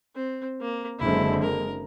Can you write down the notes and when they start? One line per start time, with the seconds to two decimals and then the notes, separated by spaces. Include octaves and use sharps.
0.16 C4
0.61 A#3
0.99 F#1 D3 G#3 C4 E4
1.43 A#4